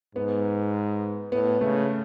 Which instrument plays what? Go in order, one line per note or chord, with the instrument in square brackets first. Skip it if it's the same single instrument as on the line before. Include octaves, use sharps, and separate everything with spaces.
[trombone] G#2 [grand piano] B3
[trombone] A2 [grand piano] B3
[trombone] C#3 [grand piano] A3